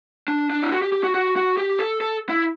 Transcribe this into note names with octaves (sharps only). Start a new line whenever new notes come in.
D4
D4
E4
F#4
G4
G4
F#4
F#4
F#4
G4
A4
A4
E4